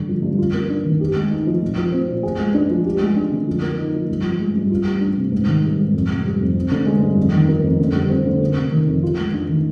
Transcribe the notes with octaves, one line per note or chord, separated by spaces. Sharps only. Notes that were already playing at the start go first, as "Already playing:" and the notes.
Already playing: G2 D3
F3
G2
F4
A#3
D4
D#3
G4
G#3
D#4
F3
A#2
F3
C4
A#2
G#4
G#3
D4
F3
G4
G#3
D4
D3
F3
A#3
D#4
F3
G2
F3
G#3
G2
F4
G3
D4
C3
G#2
D#3
G3
G#2
F2
C3
G3
F2
C4
D3
G#3
G2
F2
D#3
A#3
F2
D3
G3
C4
D3
A#3
C3
D#3
F2
F4
G#3
D4
D#3